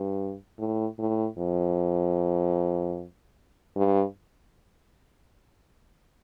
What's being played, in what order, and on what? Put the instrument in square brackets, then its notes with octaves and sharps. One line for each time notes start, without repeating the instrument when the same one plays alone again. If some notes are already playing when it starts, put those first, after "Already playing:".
Already playing: [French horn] G2
A2
A2
F2
G2